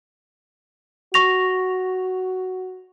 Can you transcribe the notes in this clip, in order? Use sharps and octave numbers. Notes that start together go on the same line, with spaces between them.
F#4 C#6 A#6 F7